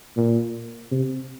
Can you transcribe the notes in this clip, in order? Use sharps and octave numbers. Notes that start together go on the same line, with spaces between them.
A#2
C3